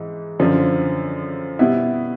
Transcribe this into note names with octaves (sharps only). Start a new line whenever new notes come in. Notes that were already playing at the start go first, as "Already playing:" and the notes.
Already playing: G#2 E3
F#2 D3 F3
B2 G3 B3 E4